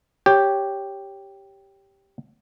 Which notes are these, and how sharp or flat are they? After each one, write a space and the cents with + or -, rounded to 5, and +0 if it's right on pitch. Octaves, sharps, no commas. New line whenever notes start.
G4 +0 C#5 +0